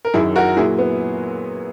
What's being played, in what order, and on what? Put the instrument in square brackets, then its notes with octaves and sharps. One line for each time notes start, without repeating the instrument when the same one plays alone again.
[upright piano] A#4
F#2 D#3 F#3 E4 G#4
F#4 A#4
A#2 F#3 E4 G#4
B3